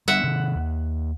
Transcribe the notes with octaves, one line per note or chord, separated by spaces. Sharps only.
G3 B3 D4 E5 F#5
C3 D#3
D#2